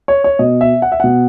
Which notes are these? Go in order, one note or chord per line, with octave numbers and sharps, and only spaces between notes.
C#5
C#5
B2 D#5
E5
F#5
E5
B2 F#5